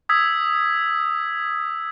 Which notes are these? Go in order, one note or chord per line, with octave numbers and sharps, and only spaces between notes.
D#6 E6 G#6 B6